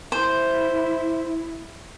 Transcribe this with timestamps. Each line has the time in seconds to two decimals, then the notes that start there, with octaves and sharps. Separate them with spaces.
0.12 E4 C5